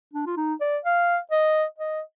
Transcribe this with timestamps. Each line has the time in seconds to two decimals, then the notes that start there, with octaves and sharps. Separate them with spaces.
0.13 D4
0.27 F4
0.37 D#4
0.61 D5
0.85 F5
1.31 D#5
1.79 D#5